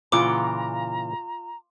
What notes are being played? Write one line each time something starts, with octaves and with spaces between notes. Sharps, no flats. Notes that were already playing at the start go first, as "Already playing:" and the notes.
A#2 C#3 E3 F4 F#5 G5 A#5 D6